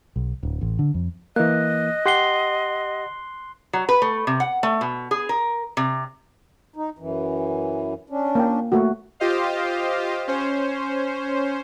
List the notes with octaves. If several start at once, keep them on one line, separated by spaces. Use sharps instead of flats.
B1
D1
A1
D3
F2
E3 A#3 D#5 F#6
G4 F#5 C6 C7 G7
F#3
B4
A3
C3
F#5
A3
B2
G#4
A#4
C3
D#4
F#2 E3
C#4 D4
A#3 G5
A3 A#3 F#4
F4 G4 C5 D#5 F5
C#4 C5